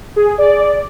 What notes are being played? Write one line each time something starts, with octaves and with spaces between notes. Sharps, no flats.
G#4
D5